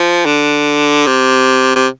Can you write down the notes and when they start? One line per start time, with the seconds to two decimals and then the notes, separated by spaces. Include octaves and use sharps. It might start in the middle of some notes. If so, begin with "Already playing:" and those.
Already playing: F3
0.26 D3
1.07 C3
1.76 C3